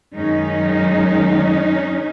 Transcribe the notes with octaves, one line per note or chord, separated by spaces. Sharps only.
F#2 D#3 G#3 C#4 D#4